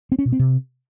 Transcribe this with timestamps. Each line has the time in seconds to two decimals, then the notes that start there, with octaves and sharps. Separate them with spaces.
0.12 C4
0.19 C#4
0.26 B2
0.32 C4
0.39 C3